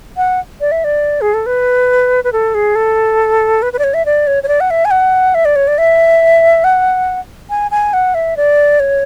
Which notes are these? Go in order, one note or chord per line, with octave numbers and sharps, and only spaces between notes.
F#5
D5
E5
D5
G#4
A4
B4
B4
A4
G#4
A4
B4
B4
D5
C#5
E5
D5
C#5
C#5
D5
F#5
E5
G#5
F#5
E5
D5
C#5
D5
E5
F#5
G#5
G#5
F#5
E5
D5
C#5